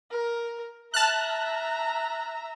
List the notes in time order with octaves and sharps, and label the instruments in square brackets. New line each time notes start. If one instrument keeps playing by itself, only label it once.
[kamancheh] A#4
[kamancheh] E5 A#5 [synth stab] A5 F6 F#6